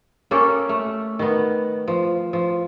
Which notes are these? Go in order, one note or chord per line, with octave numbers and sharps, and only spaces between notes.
A#3 C#4 G4 A4
A3
D#3 B3
F3
F3